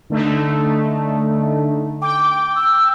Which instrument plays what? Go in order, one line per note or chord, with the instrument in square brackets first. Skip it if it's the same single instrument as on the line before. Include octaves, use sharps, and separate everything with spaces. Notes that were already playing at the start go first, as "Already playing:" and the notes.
[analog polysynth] D3 A3 D#4
[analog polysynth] G5 [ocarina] D6
[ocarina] E6